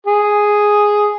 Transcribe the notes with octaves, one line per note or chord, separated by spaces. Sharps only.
G#4